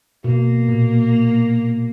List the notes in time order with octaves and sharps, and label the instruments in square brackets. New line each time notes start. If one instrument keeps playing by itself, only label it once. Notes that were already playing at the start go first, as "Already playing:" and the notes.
[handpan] B2 [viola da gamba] A#3
[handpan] A#2